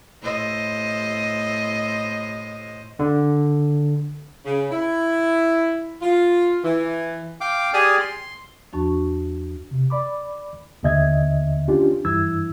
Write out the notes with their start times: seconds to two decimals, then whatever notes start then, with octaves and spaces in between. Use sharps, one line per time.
0.22 A2 C5 D#5
2.99 D3
4.45 C#3
4.71 E4
6.02 F4
6.64 E3
7.41 F5 G5 D6
7.74 G4 G#4 D5 G#5 D#6 F6
8.00 C6
8.73 E2 F3 D4 F#4 A5 C#6
9.71 C3
9.90 D5 B5 D6
10.83 D#2 D3 A#3 D#5 E5 G#6
11.68 C#4 D4 F4 G4
12.05 G2 E3 E4 E6 G#6